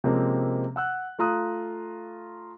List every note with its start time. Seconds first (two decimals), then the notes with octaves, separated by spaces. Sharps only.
0.04 C3 F3 G#3 A#3 C4 C#4
0.76 F#5 E6 F#6
1.19 A3 F4 A#5 D#6 F#6